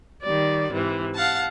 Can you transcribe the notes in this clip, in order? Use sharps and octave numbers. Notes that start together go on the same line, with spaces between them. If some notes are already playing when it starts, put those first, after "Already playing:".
D#3 G3 D5
G#2 C3 E3
F5 F#5 A5